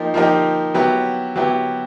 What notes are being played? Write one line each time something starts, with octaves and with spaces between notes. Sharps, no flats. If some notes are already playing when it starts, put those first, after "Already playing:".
Already playing: F3 A#3 D#4 G4
F3 A#3 D#4 G4
F#3 B3 E4 G4
F#3 B3 E4 G4